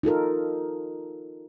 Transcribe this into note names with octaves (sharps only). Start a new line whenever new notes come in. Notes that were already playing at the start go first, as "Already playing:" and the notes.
D#4 F4 A4 A#4